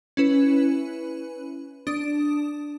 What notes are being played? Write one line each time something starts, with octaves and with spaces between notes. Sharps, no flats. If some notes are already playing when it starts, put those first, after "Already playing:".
C#4 E4 B4
D4 D#6